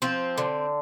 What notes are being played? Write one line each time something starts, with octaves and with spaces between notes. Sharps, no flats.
F3 C4
D3